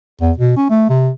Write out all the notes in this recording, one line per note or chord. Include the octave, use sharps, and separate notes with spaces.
E2
B2
C#4
A3
C3